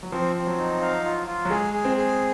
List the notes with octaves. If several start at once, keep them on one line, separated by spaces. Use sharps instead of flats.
F#3
F3 C4
C4
F#3
D#4
F5
F4
F4
F#3
G#3 G#4
G#4
C4
G#4